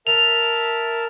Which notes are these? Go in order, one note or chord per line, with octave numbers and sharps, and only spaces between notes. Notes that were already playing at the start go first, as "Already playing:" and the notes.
A#4 E5 A5 F7